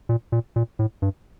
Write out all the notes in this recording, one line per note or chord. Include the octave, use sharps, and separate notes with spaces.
A#2
A#2
A#2
A2
G2